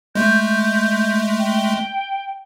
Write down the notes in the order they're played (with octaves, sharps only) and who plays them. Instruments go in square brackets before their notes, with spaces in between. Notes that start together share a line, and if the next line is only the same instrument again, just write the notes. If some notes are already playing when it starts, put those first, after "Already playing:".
[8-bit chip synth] G#3 A3 [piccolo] G6
[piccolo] G5